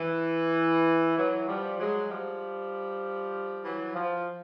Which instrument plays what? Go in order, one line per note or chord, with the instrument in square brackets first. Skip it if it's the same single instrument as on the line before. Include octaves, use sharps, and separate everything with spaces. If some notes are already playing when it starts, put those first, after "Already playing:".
Already playing: [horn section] E3
E3 F#3
F3 G3
F#3 G#3
F3 G3
E3 F#3
F3